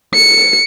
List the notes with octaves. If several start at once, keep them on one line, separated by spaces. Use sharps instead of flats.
C#7